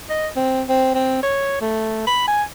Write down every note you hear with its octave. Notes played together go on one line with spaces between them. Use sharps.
D#5
C4
C4
C4
C#5
A3
B5
G#5